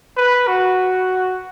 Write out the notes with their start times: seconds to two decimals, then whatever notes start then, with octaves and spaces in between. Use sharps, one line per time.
0.17 B4
0.47 F#4